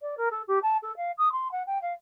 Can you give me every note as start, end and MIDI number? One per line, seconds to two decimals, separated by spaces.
0.02 0.15 74
0.17 0.29 70
0.31 0.42 69
0.47 0.59 67
0.62 0.77 81
0.82 0.95 69
0.97 1.12 77
1.18 1.32 87
1.32 1.51 84
1.51 1.63 78
1.66 1.79 79
1.82 1.93 77